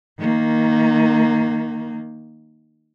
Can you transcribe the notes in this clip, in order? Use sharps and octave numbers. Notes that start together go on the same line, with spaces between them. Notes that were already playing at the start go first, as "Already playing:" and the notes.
D#3 A#3